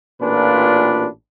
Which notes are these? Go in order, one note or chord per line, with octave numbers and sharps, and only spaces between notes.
A1 A#2 D4 F4 B4